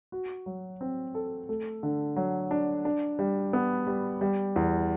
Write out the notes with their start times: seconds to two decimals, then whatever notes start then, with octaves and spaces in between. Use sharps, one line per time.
0.12 F#4
0.46 F#3
0.81 C4
1.15 A4
1.49 A3
1.83 D3
2.16 F#3
2.51 D4
2.85 D4
3.19 G3
3.53 B3
3.87 G3
4.21 G3
4.56 E2